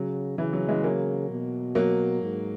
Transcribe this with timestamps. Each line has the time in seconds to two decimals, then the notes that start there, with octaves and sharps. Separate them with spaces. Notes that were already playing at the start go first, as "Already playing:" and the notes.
Already playing: C#3 F#3
0.38 C#3 E3
0.53 F#3
0.68 E3 G#3
0.84 F#3 A#3
1.30 B2
1.75 F#3 A#3
2.22 G#2